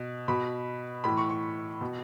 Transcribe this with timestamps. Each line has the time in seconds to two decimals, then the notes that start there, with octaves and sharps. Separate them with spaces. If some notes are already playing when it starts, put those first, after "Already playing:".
Already playing: B2
0.28 B2 B5
1.04 A2 E3 B5
1.17 C#6
1.29 C#6
1.81 B2